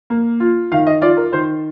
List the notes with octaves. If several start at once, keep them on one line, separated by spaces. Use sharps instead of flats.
A#3
F4
D#3 F5
D#5
F4 D5
A#4
D#3 C5